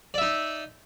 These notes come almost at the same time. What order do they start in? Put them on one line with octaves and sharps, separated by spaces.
D5 E5 D#4